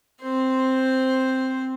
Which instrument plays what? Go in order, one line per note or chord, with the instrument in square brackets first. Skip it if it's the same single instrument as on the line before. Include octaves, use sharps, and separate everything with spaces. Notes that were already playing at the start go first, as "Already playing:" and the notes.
[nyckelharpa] C4 C5